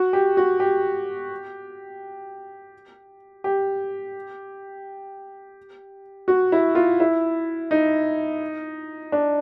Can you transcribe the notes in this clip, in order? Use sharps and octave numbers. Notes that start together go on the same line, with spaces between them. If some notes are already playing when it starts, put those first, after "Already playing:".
Already playing: F#4
G4
F#4
G4
G4
F#4
E4
F4
E4
D#4
D4